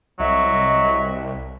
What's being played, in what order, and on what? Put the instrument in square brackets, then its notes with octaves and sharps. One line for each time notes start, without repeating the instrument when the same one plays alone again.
[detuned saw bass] C2 [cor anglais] F#3 [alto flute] D#5 [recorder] E5